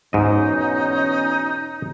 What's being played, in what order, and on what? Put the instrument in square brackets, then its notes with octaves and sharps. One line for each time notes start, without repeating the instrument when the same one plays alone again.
[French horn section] E2 B2 C#4 [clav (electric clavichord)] G#2 D#5 [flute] D#4